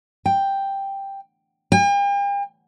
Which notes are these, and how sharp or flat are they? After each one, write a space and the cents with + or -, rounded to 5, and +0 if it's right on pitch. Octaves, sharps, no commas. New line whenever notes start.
G5 +5
G5 +45